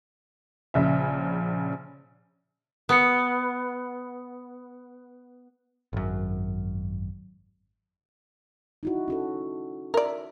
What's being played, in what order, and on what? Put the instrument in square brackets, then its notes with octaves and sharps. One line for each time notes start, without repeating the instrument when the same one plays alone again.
[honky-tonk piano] A#1 C#3 E5
[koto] B3 [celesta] D#6 C#7
[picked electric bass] G#1 F#2
[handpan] D#4 E4 F#4
C#4 F#4 A4
[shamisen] A#4 D5 [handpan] E5